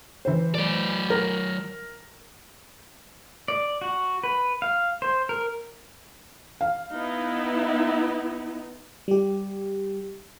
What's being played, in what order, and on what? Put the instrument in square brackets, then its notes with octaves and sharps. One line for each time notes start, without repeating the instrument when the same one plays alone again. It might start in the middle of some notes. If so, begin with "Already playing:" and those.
[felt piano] E3 C5
[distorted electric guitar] F#3 D5
[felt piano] A#4
[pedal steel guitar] D5
F#4
B4
F5
C5
A#4
[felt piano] F5
[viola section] B3 D#4 E4
[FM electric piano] G3 G4